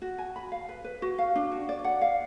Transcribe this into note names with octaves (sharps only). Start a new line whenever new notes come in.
F#4
G#5
B5
F5
B4
B4
F#4
F5
D4
F#4
D5
F#5
F5